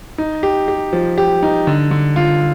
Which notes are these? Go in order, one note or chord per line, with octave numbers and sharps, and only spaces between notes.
D#4
G4
G4
F3
G4
D#4
D3
D3
F4